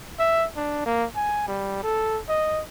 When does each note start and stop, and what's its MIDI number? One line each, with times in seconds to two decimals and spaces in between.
0.19 0.45 76
0.56 0.81 62
0.86 1.05 58
1.16 1.47 80
1.48 1.82 55
1.83 2.19 69
2.29 2.61 75